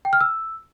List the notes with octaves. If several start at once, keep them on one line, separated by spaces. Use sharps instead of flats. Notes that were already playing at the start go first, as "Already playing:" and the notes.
G5
F6
E6